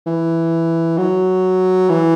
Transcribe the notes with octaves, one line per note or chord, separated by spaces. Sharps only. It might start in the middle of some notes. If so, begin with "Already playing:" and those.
E3
F#3
E3